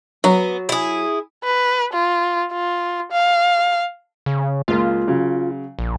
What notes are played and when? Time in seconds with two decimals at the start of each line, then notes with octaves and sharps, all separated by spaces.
0.24 F#3 B3
0.69 E4 G#4
1.44 B4
1.93 F4
2.52 F4
3.12 F5
4.26 C#3
4.68 C#2 A#3 F4
5.07 C#3 F#3
5.79 A#1